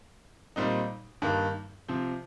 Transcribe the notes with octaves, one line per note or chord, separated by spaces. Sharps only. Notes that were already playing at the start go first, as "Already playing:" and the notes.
A#2 G3 C4 D#4
G2 D#3 A#3
C3 F3 C4